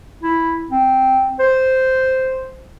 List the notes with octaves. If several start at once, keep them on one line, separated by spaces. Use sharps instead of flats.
E4
C4
C5